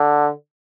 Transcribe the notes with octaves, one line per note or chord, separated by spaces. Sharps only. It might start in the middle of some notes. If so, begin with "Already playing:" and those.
Already playing: D3